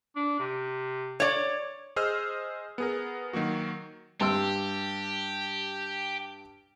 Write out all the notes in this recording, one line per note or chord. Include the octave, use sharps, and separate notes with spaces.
D4
C3
C#5 D5
G#4 C5 D#5 E6 F6
B3 G#4 A#4
D#3 F#3 A#3 F#4
G2 G4 C6 E6